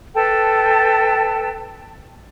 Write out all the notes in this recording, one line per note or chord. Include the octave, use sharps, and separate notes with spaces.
A4 B4 G5 A5